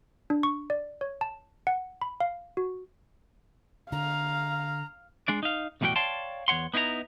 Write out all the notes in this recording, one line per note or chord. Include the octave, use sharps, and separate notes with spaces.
D4
C#6
D5
C#5
A5
F#5
B5
F5
F#4
D3 F5 A#5
G#3 D4 D5
D#4 F5
B1 E2 A2 G3 F#4 G5
C#5 D5 F5 G5 A5 C6
E2 A#2 C#5 F#5 C6
B3 D#4 E4 B4 A#5